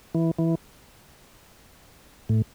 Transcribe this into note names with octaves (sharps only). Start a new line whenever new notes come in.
E3
E3
A2